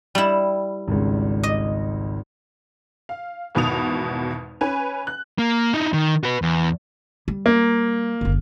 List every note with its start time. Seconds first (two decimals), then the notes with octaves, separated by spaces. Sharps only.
0.15 G3 E4
0.88 G#1 C#2
1.43 D#5
3.09 F5
3.55 G#1 E2 B2 B5 D#6 F7
4.61 C#4 B4 G#5
5.07 F#6
5.38 A#3
5.74 D#4 E4
5.93 D#3
6.23 F#4 B4
6.42 E2
7.28 G3
7.46 A#3
8.21 F#1 D3